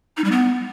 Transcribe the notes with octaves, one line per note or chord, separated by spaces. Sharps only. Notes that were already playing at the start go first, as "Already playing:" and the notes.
D#4
G3
B3